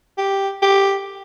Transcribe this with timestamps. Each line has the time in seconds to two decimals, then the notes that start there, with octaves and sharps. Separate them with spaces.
0.18 G4
0.62 G4